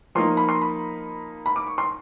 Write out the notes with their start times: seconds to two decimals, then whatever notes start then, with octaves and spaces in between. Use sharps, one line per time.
0.15 F3 A#3 D#4 C6
0.37 B5
0.49 C6
0.61 B5
1.46 B5
1.56 D6
1.67 C#6
1.78 C6